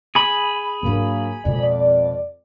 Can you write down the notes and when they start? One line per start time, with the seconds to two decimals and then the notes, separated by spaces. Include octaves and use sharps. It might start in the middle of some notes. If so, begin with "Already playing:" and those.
0.15 G#4 B5
0.83 G#2 F#3 A#3 D4
1.45 F2 B2 G#3 D5